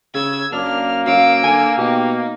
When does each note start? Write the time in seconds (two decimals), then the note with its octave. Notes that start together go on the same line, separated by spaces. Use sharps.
0.14 C#3 E6 G#6
0.52 F#2 A#3 D4 F6
1.07 F#2 F5 E6 D7
1.44 D3 G#5
1.78 B2 D#4 G4